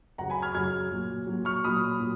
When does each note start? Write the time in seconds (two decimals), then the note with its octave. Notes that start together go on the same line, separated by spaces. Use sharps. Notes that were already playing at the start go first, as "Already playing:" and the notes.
0.18 F#2 C#3 F#3 F#5 A#5
0.30 G#5 B5
0.42 F6 G#6
0.54 F#2 C#3 F#3 F6 G#6
0.91 A#2 F#3
1.27 A#2 F#3
1.45 C#6 F6
1.64 A#2 F#3 B5 D#6
2.00 A#2 F#3